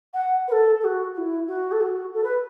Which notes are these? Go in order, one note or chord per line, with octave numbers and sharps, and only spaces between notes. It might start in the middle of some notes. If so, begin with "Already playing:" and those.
F#5
B4
A4
A4
F#4
F#4
E4
F#4
A4
F#4
A4
B4